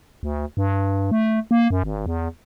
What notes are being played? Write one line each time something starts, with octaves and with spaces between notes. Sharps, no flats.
D2
G2
A3
A#3
F#2
G#1
E2